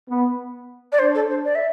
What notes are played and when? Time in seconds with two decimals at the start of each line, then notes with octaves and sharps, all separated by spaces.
0.09 B3
0.92 D5
0.99 D4 C5
1.15 A4
1.30 C5
1.45 D5
1.55 E5